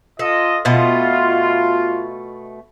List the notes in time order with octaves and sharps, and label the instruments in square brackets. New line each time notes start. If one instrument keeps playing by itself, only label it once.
[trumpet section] F4 D#5 [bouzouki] A4
[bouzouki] B2 A3 D#5 [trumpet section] F4